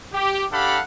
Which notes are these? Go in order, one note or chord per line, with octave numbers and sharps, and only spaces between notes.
G4
D4 G4 A4 F5 F#5 B5